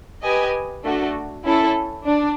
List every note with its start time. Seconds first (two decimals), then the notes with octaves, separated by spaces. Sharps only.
0.23 G4 B4 D#5 G#5
0.84 A3 D4 F#4 A4
1.45 C#4 E4 A4
2.05 D4